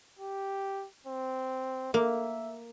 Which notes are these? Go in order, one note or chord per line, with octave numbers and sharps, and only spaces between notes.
G4
C4
A#3 E5